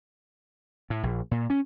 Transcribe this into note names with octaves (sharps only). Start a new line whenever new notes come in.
A2
A#1
A#2
C#4